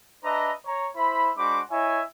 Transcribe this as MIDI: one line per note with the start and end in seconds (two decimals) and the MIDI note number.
0.24 0.52 62
0.24 0.52 71
0.24 0.52 75
0.24 0.52 76
0.24 0.52 82
0.66 0.88 73
0.66 0.88 82
0.96 1.31 64
0.96 1.31 72
0.96 1.31 76
0.96 1.31 83
1.38 1.61 56
1.38 1.61 62
1.38 1.61 66
1.38 1.61 72
1.38 1.61 83
1.38 1.61 86
1.71 2.02 64
1.71 2.02 73
1.71 2.02 75
1.71 2.02 76
1.71 2.02 80